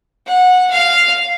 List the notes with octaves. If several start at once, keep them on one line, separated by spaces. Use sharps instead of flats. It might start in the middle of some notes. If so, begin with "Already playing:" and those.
F#5
F5